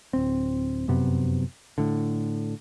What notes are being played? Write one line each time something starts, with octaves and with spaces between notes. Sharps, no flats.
D1 C4
F1 F#2 C3 B3
A2 D3